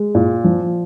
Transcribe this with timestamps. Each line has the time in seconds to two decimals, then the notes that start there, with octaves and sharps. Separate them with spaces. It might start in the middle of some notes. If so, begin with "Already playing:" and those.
Already playing: G#3
0.15 A#2
0.44 F3